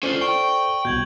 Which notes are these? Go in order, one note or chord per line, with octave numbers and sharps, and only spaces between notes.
C#4 F4 A4 C5 D5 F#7 G7
G5 C#6
C2 B2 G6 G#6 F#7